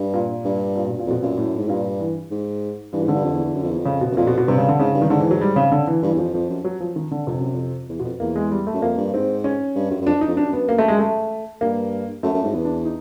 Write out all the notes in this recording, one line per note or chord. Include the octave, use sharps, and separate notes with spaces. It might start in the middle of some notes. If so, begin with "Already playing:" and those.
Already playing: G2
A#2
G2
A#2
B2
A#2
F2 B2
F#2 A#2
A2
G#2
G2 A#2
E3
G#2
G2 E3
G#2
D3
G2
F2
E2
E2
F#2
F2
E2
F2
C#3
B2
F#2
F2 A#2
B2
B2
G2 C3
C#3
D3
G#2 C#3
G2
D#3
G#2 D3
E3
F#3
G3
C#3
D3
E3
G2 E3
E2
F2 F3
F2 F3
F#2
F#3
F3
D#3
D3
F2 C3
F#2
F2
E2
B2
F2
E2 A#3
G#3
G3
A3
F#2
F2 A#3
G2
G#2 C4
C#4
G2
F#2
F#2
F2 D4
D#4
F2
F#2 D4
B3
A#3
A3
G#3
A3
G2 A#3
F#2 A3
F#2
G#2
E2 B3
D4
D#4